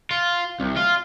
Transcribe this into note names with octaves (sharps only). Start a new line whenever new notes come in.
F4
C2
F4